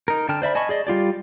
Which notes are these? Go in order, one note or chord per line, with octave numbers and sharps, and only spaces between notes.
D#4 A#4
D3 G5 A5 F6
C5 D5 E5 B5
D#5 G#5 A5 B5 C#6
G#4 D5 D#5
G3 F4 G4 D5